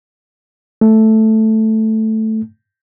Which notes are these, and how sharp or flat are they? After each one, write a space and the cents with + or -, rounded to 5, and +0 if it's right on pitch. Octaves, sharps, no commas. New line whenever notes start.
A3 +0